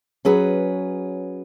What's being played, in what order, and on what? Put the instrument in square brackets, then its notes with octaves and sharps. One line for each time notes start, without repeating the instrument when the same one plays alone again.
[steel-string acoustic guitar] F#3 C#4 G#4 B4